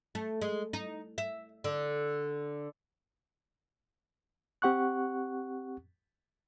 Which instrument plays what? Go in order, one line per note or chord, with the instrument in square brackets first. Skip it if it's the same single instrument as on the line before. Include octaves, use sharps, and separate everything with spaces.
[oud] A3
G#3
D#4
E5
D3
[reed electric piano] C4 G4 F#5 C#6 F#6